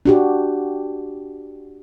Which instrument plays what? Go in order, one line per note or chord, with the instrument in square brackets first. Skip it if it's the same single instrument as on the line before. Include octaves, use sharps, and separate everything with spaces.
[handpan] D4 F#4 G4